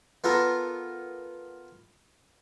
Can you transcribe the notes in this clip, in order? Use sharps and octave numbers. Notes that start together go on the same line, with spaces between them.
B3 F4 A4 A#4